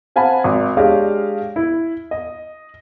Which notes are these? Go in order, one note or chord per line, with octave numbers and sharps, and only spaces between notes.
C4 F5 F#5 G#5 A5 B5
G#1
G#3 D4 G4 C#5 D#5 F5
E4
D#5